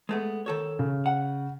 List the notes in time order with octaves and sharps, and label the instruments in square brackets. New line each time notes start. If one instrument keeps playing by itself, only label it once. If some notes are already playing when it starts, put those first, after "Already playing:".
[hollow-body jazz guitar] G#3 A3 B3
D#3 A4 C#5
[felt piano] C#3
[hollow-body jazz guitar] F#5